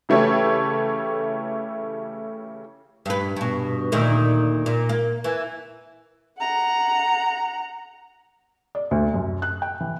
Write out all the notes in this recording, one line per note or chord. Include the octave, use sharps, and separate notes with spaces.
C#3 E3 A3 G4 C#5
G2 B4
G2 B2
D2 A#2 D#3
A#2
A#3
E3
F#5 A#5
D5
D2
F#2
F#6
G5
E3